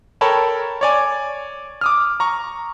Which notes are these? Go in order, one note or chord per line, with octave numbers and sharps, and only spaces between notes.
A4 A#4 C#5 G5 A5 B5
C#5 D5 G#5
D6 D#6 F6
A#5 C#6